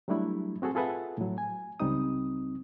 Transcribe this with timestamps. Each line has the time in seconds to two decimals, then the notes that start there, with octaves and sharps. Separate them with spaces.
0.08 F#3 G3 A3 D4 E4
0.62 C4 F#4 G#4 A4
0.75 F4 G#4 A4 B4 E5 F#5
1.18 A2 F#3
1.38 G#5
1.80 C#2 G3 C4 D#4 D#6